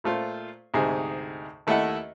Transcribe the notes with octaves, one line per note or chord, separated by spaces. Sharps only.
A#2 A3 F4 C5
D2 G#2 C3 D#4 G#4
D#2 A3 E4 D#5 E5 F#5